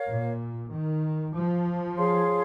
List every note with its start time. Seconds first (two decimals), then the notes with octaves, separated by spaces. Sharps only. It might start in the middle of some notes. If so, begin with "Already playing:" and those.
Already playing: A#4 C#5 F5
0.08 A#2
0.72 D#3
1.34 F3
1.97 G#4 C#5 F5 C6